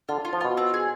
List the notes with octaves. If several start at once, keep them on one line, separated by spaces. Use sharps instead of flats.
D3 F4
F4
F3
B2 F4
C4
G#4